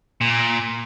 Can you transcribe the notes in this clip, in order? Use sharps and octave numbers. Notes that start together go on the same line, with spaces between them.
A#2